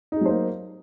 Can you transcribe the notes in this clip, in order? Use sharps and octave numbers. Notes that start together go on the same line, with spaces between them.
F#3 A#3 D#4 G#4 C5